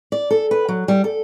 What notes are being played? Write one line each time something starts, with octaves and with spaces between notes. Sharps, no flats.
D5
A4
B4
F#3
G3
A4